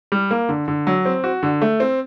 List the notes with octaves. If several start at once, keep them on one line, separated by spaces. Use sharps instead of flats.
G3
A#3
D3
D3
F#3
C4
F#4
D3
A3
C4